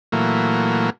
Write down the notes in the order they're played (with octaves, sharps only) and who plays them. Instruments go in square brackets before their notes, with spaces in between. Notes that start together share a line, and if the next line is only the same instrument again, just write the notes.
[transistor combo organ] A#2 E3 F#3 A3 A#3